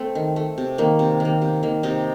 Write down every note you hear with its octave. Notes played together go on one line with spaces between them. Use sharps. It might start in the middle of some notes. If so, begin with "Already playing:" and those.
Already playing: A3 C4
D#3
A3
C3
D#3 A#3
C3
D#3 A#3
C3
D#3 A#3
C3 D#4